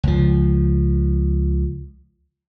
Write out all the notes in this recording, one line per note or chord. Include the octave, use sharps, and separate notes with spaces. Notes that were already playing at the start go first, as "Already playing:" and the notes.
C#2 F3